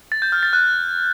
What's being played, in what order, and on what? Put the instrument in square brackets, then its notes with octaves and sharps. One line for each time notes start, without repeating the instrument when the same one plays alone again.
[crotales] A6
G6
F6
A6
F#6